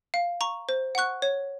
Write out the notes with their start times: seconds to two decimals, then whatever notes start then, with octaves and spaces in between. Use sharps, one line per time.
0.14 F5
0.41 A#5 C#6
0.69 C5
0.95 F#5 C#6 F#6
1.22 C#5